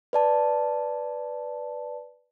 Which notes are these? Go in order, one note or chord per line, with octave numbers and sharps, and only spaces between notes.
B4 D5 A5